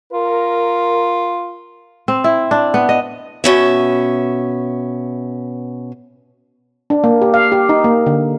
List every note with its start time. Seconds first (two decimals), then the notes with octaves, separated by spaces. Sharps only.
0.13 F4 A#4
2.08 C4
2.24 E4
2.51 D4
2.74 B3
2.89 D#5
3.44 B2 C#4 E5
6.90 D4
7.04 A#3
7.22 G4
7.34 F5
7.52 G4
7.69 D#4
7.84 A#3
8.06 D3